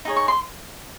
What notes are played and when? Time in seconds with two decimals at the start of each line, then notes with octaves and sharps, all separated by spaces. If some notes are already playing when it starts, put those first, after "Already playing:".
0.05 D#4 G#4 C#5
0.17 C#6
0.28 C6